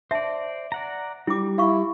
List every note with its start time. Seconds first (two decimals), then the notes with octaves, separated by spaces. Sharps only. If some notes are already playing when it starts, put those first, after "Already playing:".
0.11 C5 D5 E5 A5
0.72 D5 F#5 A#5
1.27 G3 E4 D6
1.58 E4 F5 C#6